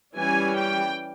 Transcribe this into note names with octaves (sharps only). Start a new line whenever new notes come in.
E3 G3 C#4 G#5
G5